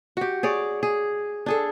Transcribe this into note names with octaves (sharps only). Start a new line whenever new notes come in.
F#4 G4
G#4 C#5 D5
G#4
D4 G#4 A4